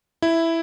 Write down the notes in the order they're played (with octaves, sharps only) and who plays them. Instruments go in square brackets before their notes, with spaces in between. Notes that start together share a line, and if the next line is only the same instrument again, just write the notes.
[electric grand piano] E4